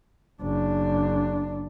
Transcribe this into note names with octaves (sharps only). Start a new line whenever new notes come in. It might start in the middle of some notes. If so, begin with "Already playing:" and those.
F#1 D4